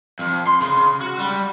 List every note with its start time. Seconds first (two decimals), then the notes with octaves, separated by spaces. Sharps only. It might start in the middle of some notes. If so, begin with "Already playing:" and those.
0.19 F2
0.47 C6
0.61 C#3
1.01 F#4
1.19 G3